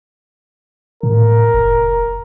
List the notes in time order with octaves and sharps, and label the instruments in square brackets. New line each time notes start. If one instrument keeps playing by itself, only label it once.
[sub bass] A2 [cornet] A#4
[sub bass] F1